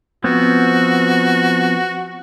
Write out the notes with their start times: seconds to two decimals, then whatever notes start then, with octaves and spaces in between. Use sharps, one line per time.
0.24 F3 B3 C4 F#4